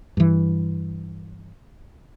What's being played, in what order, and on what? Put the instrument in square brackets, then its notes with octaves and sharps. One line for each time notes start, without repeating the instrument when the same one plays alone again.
[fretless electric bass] G2 E3